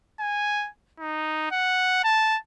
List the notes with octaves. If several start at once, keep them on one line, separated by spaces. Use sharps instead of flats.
G#5
D#4
F#5
A5